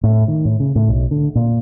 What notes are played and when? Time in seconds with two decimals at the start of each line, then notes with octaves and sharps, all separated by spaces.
0.03 A2
0.28 D#3
0.45 A2
0.60 C#3
0.75 A2
0.89 B1
1.11 D3
1.35 A#2